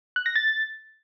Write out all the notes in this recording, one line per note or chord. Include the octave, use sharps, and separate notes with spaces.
F#6
A#6
A6